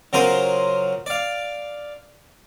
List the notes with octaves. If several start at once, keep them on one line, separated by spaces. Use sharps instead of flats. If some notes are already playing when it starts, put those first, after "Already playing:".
C#3 F#3 F4 A#4 C5 D#6
D5 F5